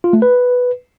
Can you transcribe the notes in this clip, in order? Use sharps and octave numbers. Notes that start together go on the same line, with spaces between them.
F4
A3
B4